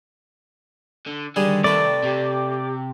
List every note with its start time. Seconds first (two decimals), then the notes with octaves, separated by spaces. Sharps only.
1.07 D3
1.36 D3 D#3 G3 G#4
1.64 C3 A3 B4 D5
2.03 C3 G4